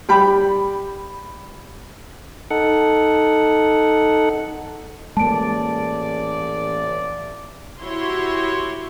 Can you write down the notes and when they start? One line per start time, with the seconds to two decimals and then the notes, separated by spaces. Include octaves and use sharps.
0.09 G3 G5 B5
2.51 D#4 A4 F#5
5.17 A1 G#3 A#3 D5 A5 D7
7.81 E4 F#4 G4 C#5 C6